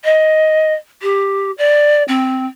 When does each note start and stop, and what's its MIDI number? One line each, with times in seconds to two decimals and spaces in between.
0.04 0.73 75
1.02 1.51 67
1.58 2.03 74
2.08 2.46 60